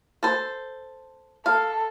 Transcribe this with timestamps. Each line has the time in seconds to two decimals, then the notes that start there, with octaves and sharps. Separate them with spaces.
0.23 A4 C5
1.46 A4 F5